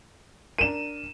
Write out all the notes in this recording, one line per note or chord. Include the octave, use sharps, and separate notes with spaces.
D4 A#4 D#7 E7